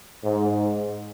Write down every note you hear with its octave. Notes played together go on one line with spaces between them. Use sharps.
G#2